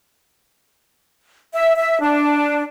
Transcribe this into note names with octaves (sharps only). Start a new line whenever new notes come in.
E5
E5
D4